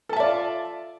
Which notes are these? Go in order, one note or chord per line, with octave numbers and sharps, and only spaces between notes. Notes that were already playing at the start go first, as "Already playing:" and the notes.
F4 A4 D5 E5 A5